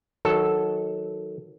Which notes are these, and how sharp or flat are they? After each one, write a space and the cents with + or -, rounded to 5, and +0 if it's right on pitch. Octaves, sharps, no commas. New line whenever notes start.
D#3 +20 F#3 +0 A4 -5